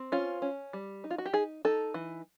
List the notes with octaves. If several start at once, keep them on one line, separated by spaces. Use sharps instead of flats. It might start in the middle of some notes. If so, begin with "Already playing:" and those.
Already playing: C4
C#4 F4
C#4
G3
D#4
F4
F#4
G4
D#4 G#4
D#4 A4
E3